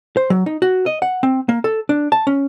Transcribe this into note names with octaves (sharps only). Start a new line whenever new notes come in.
C5
F#3
D#4
F#4
D#5
F#5
C4
A#3
A4
D4
A5
C#4